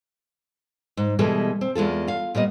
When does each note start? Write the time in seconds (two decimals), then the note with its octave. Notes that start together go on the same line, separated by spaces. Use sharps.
0.97 G#2
1.19 B2 E3 G3 G#3 A4
1.61 C4
1.75 E2 G#3 F4 A4
2.08 F4 F5
2.35 A#2 G3 B3 D#5